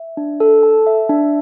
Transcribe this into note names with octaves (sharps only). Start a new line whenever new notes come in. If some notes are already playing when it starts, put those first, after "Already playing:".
Already playing: E5
D4
A4
A5
E5
D4